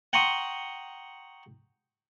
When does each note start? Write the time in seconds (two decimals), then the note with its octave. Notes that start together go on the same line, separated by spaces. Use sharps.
0.13 F#5 G5 A#5 C6 C#6 D#6